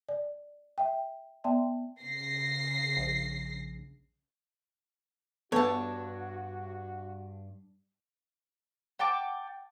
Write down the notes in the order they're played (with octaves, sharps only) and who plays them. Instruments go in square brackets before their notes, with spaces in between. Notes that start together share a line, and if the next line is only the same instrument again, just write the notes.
[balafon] D5
E5 G5
B3 D5 E5 G5 A5 C6
[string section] C#3 A#6 C7
[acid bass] A#1
[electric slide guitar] G2 D4 [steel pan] B3 A4 [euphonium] F#4 [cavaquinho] C#5 A5
[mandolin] F#5 G5 A5 D6